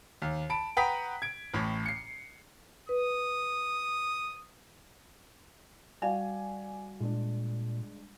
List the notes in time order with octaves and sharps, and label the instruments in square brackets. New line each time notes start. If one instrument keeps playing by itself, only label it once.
[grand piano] D#2
A5 B5 D7
B4 F#5 G5 A#5 D#6 B6
G#6 D7
A1 A2 C#5
C7 C#7
[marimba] B4 [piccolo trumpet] D#6
[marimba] G3 F5 [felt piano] F#4 D5 G#5
[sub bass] A#2 [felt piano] G#3 D4